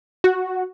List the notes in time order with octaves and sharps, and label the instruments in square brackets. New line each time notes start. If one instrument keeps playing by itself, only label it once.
[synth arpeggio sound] F#4